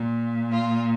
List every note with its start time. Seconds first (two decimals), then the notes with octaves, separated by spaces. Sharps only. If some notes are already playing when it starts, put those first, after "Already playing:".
Already playing: A#2
0.50 F4